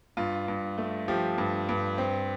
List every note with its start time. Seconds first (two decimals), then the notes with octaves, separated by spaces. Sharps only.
0.17 G2 F4
0.48 G2
0.78 A3
1.08 F3 G4
1.38 G2
1.69 G2
1.98 C4